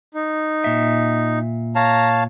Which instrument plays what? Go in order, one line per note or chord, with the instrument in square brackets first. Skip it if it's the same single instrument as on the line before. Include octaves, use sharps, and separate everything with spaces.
[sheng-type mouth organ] D#4
[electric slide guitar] A#2 E5
[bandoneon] C#5 F5 A5 [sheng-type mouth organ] A#5